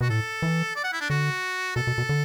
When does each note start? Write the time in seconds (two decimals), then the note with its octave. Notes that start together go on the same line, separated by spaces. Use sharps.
0.01 B2 F#4
0.10 A2 A4
0.42 E3
0.76 D5
0.84 F#5
0.93 E4
1.01 D4
1.10 D3 F#4
1.76 B2 A4
1.87 B2
1.98 B2
2.09 D3